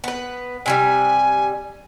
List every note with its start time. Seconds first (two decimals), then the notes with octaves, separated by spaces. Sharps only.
0.04 B3 B4
0.66 C3 D#3 G3 G#5